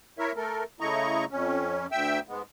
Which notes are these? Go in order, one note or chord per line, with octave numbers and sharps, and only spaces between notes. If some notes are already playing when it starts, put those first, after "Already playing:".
E4 A#4 C#5 E5
A3 A4 A#4
C#3 A3 E4 D#5 A#5 C#6
F2 C#4
D2 E5 G5 E6
G#2 G#3 B3